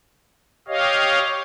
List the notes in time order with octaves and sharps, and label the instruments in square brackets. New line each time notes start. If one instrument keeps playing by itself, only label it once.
[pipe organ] G4 C#5 D#5 F5